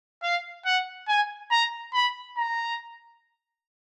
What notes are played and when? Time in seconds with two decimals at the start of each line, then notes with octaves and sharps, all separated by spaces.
0.23 F5
0.65 F#5
1.08 G#5
1.51 A#5
1.94 B5
2.37 A#5